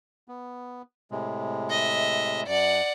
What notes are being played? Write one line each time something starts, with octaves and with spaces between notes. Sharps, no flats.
B3
A2 C3 G#3
D#5 E5
F#2 D5 F#5